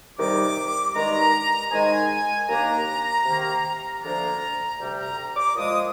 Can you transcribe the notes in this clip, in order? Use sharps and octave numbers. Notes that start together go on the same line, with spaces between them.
C3 D#3 G3 D6
G2 D#3 G#3 A#5
G#2 D#3 G#3 D#4 G#5
D#2 D#3 A#3 D4 A#5
C3 D#3 A#3
D2 D3 F3 A#3 D4 A#5
D2 C3 G3
A#5
D6
A#2 F3 G#3 D#6